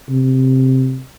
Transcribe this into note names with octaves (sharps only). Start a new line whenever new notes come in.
C3